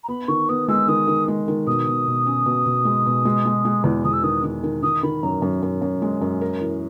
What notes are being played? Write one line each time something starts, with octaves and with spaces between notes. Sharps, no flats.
A#5
B3 B5
D#3 C#6
B3 D#6
G#3 E6
D#3 D#6
D#3
G#3
D#3
B2 D#6
B2
B2
C#4
B2
B2
G#3
B2
G#3
G#3
G#3
E2
E2 D#6
E6
D#3 D#6
D#3
D#3
D#3 D#6
D#3 B5
F#2 A#5
F#2
F#2
F#2
G#3
F#2
A#4
E3